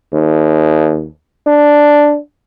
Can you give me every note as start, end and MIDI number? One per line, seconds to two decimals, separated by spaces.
0.13 1.07 39
1.47 2.18 62